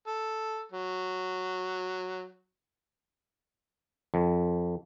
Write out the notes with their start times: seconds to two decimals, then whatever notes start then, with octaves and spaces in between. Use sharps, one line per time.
0.07 A4
0.72 F#3
4.14 F2